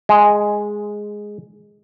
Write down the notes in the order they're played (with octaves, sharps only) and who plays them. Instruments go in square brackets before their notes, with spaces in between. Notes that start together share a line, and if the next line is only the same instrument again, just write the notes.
[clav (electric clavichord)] G#3